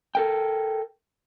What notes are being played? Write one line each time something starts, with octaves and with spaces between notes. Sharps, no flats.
A4 A#4 G5